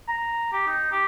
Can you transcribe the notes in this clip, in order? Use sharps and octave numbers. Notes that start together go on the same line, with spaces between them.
A#5
G4
D#4
G4